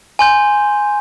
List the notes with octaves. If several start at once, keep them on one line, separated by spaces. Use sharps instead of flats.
G#5 C6 G6